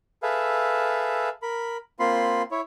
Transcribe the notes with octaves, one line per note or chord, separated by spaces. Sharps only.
G#4 A4 B4 E5 F5
A#4 B5
A#3 C4 F4 B5 C6
E4 C#5